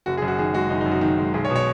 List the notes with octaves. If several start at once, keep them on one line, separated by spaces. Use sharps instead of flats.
F#1 F#4
G#4
F#2
F#4
D#3 G#4
G#3 F#4
F#1 D#4
D#4
F#2
F#4
D#3
G#3
B1 G#4
C#5
B2
C#5